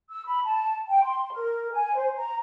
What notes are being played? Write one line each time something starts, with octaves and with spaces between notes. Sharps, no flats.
E6
B5
A5
G5
C6
A#4
G#5
C5
A#5